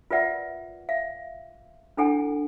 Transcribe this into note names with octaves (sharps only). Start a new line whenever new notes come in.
F4 A#4 B4 D5 E5 F#5
E5 F5
D4 E4 A4 F#5 G#5